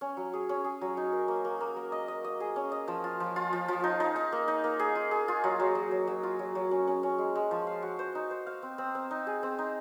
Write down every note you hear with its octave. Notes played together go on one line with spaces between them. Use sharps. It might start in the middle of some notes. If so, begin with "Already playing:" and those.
C#4
F#3
G#4
C#4
G#4
F#3
D#4
A#4
A#3
A#3
A#3
A#3
D#5
D#5
D#5
G#4
C#4
D#5
F3
F4
F3
F4
F3
F3
D#4
D#4
D#4
A#3
D#4
A#3
G#4
F4
G#4
F4
F#3
F#3
F#3
F#3
F#3
F4
F#3
F#3
C#4
C#4
C#4
G#3
G#3
F3
F5
F#4
C5
D#4
C5
F5
C4
C4
C4
D#4
G#4
C4
D#4